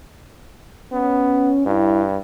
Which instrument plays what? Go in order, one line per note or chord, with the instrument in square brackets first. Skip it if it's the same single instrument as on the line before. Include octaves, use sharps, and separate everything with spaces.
[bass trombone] B3 [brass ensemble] C#4
[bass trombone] G2 [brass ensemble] G3 E4